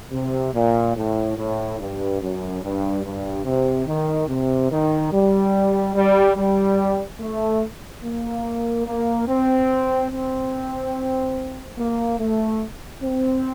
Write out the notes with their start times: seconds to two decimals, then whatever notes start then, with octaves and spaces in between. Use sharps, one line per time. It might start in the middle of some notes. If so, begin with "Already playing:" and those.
0.12 C3
0.54 A#2
0.96 A2
1.37 A2
1.79 G2
2.21 F#2
2.63 G2
3.04 G2
3.45 C3
3.87 D#3
4.28 C3
4.71 D#3
5.12 G3
5.95 G3
6.36 G3
7.20 A3
8.03 A#3
8.86 A#3
9.28 C4
10.11 C4
11.78 A#3
12.20 A3
13.03 C4